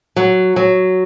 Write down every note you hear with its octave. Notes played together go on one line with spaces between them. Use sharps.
F#3
F#3